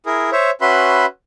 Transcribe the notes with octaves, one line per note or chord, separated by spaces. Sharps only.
E4 G#4 A#4
C5 C#5 E5
C#4 F#4 B4 E5 B5 C6